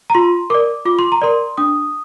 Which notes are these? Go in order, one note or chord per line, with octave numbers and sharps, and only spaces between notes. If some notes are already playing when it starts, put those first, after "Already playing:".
A#5
F4 C6
A#4 D5 D6
F4 D6
C6
A#5
A#4 D5 C6
D4 D#6